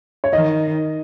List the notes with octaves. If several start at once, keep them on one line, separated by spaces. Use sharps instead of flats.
C#5
D#3 D#5